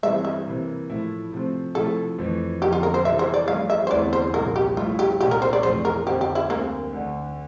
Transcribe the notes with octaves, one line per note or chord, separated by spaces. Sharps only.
G2 E3 G3 C4 E5
E5
C3 E3 A#3
A2 F3 A3 E4
C3 F3 A3 C4
C3 F3 A3 E4 A4
F2 E3 A3
F2 D3 F3 A#3 G4
F4
A#4
C5
C3 E3 G3 C4 E4 E5
C5
D5
G2 F3 A3 F5
E5
C5
E2 D3 A3 C4 E4 D5
C5
C2 A#2 F3 A#4
G4
G2 F3 A3 E4 F4
G4
C2 A#2 G3 D4 G4
A#4
C5
D5
F2 C3 E3 A3 C5
A#4
F2 D3 F3 C4 G4
G4
E4
D2 D3 G3 A#3 C4
D2 D3 A3 D4